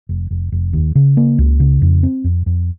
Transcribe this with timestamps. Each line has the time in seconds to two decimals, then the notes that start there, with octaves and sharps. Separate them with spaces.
0.09 F1
0.31 F1
0.52 F1
0.73 D#2
0.95 C#3
1.17 A#3
1.38 C#2
1.60 C#3
1.82 F2
2.03 C4
2.24 F2
2.46 F2